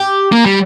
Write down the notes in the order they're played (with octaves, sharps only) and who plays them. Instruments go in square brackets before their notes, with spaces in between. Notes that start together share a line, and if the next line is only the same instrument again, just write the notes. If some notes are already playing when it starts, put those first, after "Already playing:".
Already playing: [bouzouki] G4
[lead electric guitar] A#3
G3